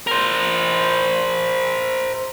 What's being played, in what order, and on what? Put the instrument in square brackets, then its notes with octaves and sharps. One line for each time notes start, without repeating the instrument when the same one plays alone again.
[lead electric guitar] A#4 C5